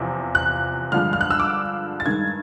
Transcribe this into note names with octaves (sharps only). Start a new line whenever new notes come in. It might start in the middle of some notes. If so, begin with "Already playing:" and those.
Already playing: E2 C3 F3
F#6
G2 D3 F3 G#3 F6
F6
F#6
E6
D6
A6
G2 D#3 G#3 G#6